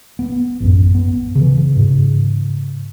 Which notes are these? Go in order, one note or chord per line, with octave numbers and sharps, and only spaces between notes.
B3
A1 F#2
B3
C#3 E3
G#2 C#3